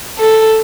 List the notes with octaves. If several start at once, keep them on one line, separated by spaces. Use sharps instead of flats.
A4